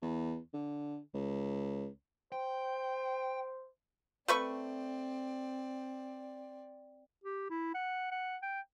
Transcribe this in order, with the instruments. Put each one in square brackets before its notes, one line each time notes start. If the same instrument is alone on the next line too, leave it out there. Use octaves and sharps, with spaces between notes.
[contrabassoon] E2
D3
C#2
[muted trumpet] C5 [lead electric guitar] G5
[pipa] A3 B4 C#6 [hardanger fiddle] C4 D5
[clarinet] G4
E4
F#5
F#5
G5